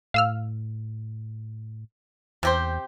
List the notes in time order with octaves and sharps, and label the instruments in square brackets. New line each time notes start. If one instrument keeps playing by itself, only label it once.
[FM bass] A2 [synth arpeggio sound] F5 E6 F6
[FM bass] E2 [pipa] C3 G4 C5